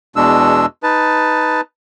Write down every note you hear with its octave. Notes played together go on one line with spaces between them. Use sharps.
E2 B2 G#3 D4 E6
D#4 B4 A5